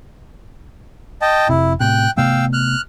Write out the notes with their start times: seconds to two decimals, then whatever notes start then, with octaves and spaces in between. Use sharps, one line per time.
1.22 D#5 G5 A5
1.49 F1 C3 E4
1.80 A2 C3 G5 F#6
2.17 C3 A3 B3 F5 G5 E6
2.53 F6 F#6